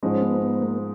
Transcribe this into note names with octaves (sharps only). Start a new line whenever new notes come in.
G#2 F3 G#3 C#4
B3
B3
A#3